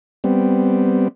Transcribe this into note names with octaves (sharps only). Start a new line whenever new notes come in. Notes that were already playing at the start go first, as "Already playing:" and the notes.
G3 B3 C4